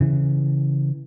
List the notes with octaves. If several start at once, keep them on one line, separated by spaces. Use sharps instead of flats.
C#3 E3